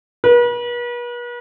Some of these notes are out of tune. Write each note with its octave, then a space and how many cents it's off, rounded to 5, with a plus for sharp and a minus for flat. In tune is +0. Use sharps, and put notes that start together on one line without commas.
B4 -40